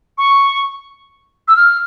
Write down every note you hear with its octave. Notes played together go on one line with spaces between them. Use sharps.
C#6
E6
F6